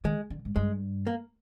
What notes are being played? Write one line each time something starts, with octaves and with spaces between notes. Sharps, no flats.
D#3 G#3
D3
G#2
G2 G#3
A#3